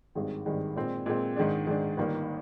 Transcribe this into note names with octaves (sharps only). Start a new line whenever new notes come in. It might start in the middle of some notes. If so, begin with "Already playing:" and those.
G#1 G2 D#3 G#3
G#1 G2 D#3 G#3
A#2 G#3 C4
A#2 G#3 C4
G#2 D#3 G#3 D4
G#2 D#3 G#3 D4
G1 G2 D#3 A#3